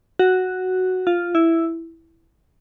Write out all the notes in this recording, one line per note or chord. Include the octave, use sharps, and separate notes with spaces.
F#4
F4
E4